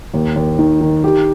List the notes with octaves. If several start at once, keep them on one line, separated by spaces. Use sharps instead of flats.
D#2
D#2
D#3
D#3
G4